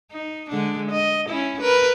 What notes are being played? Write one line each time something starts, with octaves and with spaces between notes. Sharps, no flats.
D#4
D3 G#3 D4
D#5
C#4 E4
A#4 B4